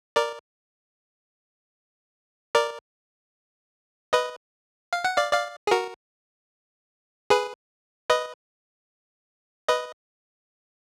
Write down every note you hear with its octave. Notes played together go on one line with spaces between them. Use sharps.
A#4 D5
A#4 D5
B4 D#5
F5
F#5
D5 F5
D5 F5
G#4
F#4 A#4
G#4 B4
B4 D#5
B4 D#5